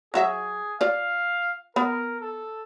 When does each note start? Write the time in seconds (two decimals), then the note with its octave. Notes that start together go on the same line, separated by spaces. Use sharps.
0.14 F#3 F#4 G#4 E5
0.81 F4 D5 F5
1.76 B3 A#4
2.21 A4